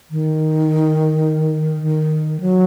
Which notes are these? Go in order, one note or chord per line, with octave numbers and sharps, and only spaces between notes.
D#3
D#3
F#3